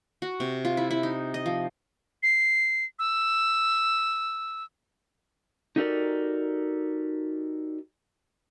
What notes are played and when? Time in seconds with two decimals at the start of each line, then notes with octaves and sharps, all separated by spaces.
0.22 F#4
0.40 C3
0.65 F4
0.77 E4
0.91 E4
1.03 D#4
1.34 D#5
1.46 F3
2.23 C7
2.99 E6
5.76 D#4 F#4 G4 A4 A#4 D5